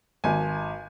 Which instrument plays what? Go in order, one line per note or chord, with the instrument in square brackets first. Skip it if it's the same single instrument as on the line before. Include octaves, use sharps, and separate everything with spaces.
[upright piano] G#1 G#5